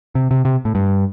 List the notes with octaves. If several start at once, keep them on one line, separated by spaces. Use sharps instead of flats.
C3
C3
C3
A2
G2